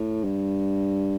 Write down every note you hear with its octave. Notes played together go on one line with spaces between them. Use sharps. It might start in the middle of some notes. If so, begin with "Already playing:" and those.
Already playing: A2
G2